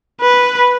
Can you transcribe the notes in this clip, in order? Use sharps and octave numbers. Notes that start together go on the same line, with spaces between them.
B4